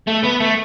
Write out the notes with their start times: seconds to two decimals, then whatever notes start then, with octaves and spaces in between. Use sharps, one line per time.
0.07 A3
0.23 B3
0.40 A3